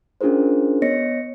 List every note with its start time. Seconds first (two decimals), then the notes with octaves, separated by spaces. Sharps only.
0.21 C#4 D4 F4 G#4 A#4 C5
0.82 B3 C#5 D#5 A#6 C#7